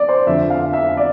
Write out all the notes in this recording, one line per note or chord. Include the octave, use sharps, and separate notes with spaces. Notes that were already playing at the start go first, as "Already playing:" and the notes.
Already playing: D5
C5
F2 D3 F3 E5
F5
E5
D5